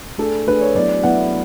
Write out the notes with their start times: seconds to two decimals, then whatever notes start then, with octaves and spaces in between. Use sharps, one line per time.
0.18 A3 D4 G#4 A4
0.47 A3 D4 G#4 B4
0.61 C#5
0.75 F#3 B3 E4 D5
1.03 F#3 B3 E4 F#5